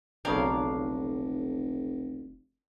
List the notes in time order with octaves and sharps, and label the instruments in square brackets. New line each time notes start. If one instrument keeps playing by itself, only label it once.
[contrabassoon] F1 [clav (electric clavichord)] B1 C#3 G5 [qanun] D4 A#4 F5